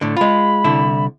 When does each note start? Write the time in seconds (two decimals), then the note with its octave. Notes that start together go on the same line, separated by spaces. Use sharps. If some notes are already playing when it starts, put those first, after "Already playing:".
0.01 A2 D3
0.17 G#3 F4 B5
0.64 C2 D3 E4